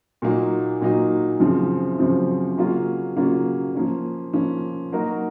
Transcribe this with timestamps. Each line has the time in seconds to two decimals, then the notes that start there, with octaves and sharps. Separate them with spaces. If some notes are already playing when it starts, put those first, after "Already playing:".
0.22 A#2 F#3 A#3 D#4
0.81 A#2 F#3 A#3 D#4
1.40 F#2 C#3 F3 C4
1.99 F#2 C#3 F3 C4
2.57 C#3 F#3 A#3 C#4 F4
3.16 C#3 F#3 A#3 C#4 F4
3.75 F3 A#3 C#4
4.33 F3 A#3 C#4
4.92 F#3 A#3 D#4 F#4 A#4